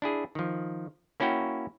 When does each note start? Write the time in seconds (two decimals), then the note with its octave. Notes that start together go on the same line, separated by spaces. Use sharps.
0.02 D4 E4 G#4
0.35 D#3 F3
1.20 A#3 C#4 E4 F#4 G5